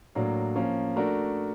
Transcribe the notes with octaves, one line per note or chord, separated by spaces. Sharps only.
A2 F#3 A#3 D4
F3 A#3 C#4
A3 D4 F#4 A#4